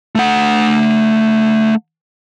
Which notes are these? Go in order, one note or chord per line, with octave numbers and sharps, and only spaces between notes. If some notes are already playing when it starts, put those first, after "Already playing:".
A3 F#5